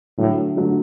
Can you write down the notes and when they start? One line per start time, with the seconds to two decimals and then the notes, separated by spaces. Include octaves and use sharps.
0.18 A2 D3 F#3 A3
0.57 D3 F#3 A3